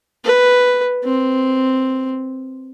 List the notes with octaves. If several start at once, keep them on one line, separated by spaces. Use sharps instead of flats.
B4
C4